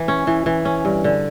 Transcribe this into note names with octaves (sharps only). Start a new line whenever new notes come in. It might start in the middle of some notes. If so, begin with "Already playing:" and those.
Already playing: E3
C#4
E3
E3
C#4
G2
D3